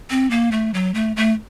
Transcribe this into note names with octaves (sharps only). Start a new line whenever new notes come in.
C4
A#3
A3
F#3
A3
A3